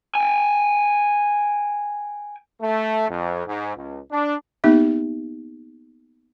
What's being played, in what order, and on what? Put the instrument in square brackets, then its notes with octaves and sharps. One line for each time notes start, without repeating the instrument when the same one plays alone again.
[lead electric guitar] G5 G#5
[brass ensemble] A3
F2
G#2
C#2
D4
[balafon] A#3 B3 D#4 G4 E5